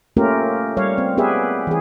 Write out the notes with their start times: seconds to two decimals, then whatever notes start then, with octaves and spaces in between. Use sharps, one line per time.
0.17 A3 A#3 C#4 F4 G4 A#4
0.77 G3 C#5 F5
0.98 C4
1.17 B3 G4 G#4 B4 E5
1.67 E3 G#4